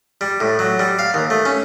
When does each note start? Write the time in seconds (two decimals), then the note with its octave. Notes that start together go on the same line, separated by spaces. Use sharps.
0.21 G3
0.41 A2
0.59 F#3
0.79 G3
0.99 F5
1.14 D#2
1.30 A3
1.45 C#4